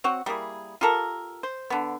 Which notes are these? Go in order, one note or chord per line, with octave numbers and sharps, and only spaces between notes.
C4 F#4 C#5 F#5
G3 A#3 E4 G#4
F4 G4 A4 A#4
C5
D3 B3